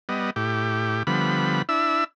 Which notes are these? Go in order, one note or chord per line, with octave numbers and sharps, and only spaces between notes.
G3 B3 D#5
A2 G4
D3 F3 G3 B3 B5
D4 E4 E5 E6